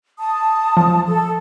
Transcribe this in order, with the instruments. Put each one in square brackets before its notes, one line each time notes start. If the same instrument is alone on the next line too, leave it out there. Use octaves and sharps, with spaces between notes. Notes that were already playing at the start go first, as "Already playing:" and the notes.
[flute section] A5 D#6
[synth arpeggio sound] F3
[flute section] A4